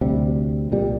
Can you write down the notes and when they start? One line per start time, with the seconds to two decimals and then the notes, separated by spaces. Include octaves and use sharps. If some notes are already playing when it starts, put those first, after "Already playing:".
0.01 D2 C3 G3
0.71 C2 A#2 G3